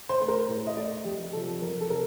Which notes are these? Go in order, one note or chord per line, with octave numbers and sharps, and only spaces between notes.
C5
A3 C5
A#4
A2
D#5
A3 D5
F2 G4
C3 F3 A4
F2 A#4
A4
C3 A#4